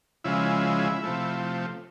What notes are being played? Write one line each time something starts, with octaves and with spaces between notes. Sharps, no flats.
C#3 F3 G#3 E4
C3 F3 A3